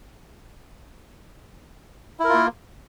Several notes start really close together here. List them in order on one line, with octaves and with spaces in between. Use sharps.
E4 A#4 F4 A#3